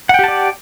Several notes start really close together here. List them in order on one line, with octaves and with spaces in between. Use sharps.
F#5 G5 G4 A5 D5